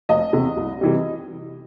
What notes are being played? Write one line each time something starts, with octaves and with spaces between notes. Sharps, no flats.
F1 D#5
E2 C3
C2
C3 E3 G3